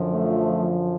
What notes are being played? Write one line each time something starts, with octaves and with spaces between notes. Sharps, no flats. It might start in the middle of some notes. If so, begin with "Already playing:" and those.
Already playing: F#2 D3 F3
A3